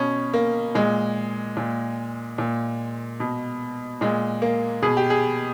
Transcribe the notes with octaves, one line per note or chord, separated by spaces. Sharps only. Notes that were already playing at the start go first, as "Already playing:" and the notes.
Already playing: B2 C#4
A#3
A#2 G#3
A#2
A#2
B2
A#2 G#3
A#3
B2 G#4
G4
G#4